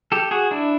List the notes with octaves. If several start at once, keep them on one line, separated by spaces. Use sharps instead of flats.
G4 A4
F#4 G#4
D4 E4